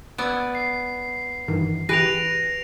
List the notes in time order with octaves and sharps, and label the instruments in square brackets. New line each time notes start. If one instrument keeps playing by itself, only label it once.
[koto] B3 D5 [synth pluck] E6 G#6
[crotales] C7
[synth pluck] G2 D#3 E3
[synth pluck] E3 G4 G#4 [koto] B4 [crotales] A#6 D7 F7